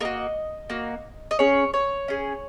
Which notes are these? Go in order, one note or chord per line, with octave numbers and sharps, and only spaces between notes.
A#3 F#4 A#4 D#5
A#3 F#4
D#5
C#4 G#4 C#5
C#5
C#4 G#4